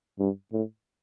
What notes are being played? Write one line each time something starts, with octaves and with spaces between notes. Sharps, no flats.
G2
A2